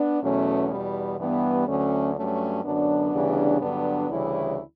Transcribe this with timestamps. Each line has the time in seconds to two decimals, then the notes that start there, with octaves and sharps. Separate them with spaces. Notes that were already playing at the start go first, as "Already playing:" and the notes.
Already playing: B3 D4
0.22 E2 B2 F#3 A3 C#4
0.70 E2 B2 G3 B3
1.19 G2 E3 G3 B3
1.67 D2 D3 F#3 A3 C#4
2.15 G2 F#3 A3 C#4
2.64 F#2 D3 F#3 B3 D4
3.13 D2 C#3 E3 G3
3.61 G2 D3 F#3 B3 D4
4.09 D2 C#3 E3 G3 C#4 E4